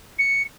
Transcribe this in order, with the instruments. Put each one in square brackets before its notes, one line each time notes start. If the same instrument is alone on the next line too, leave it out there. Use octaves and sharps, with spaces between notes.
[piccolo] C#7